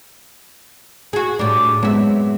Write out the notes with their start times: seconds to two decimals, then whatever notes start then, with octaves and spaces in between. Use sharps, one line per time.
1.13 F#4 G#4
1.39 A2 G3 D4
1.83 F#2 G#3 B3 C4 E5